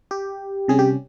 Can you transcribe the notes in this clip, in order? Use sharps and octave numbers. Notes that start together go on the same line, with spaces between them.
G4
C3 G3 C#4 G#4
G4